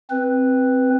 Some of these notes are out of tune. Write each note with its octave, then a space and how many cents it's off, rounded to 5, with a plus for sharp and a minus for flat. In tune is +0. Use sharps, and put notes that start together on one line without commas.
C4 +0 B4 +0